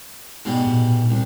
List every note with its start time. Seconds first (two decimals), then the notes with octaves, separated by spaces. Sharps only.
0.45 G#2 B2 G3
0.67 A#2
1.10 C2